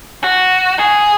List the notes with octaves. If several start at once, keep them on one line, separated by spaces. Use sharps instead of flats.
F#4
G#4